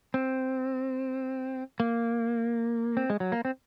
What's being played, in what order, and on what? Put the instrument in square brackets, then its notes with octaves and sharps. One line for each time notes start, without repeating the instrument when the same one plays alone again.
[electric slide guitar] C4
A#3
C4
G#3
F#3
A#3
C4